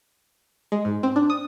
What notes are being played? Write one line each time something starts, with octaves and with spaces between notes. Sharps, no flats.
G#3
G#2
C4
D4
D#6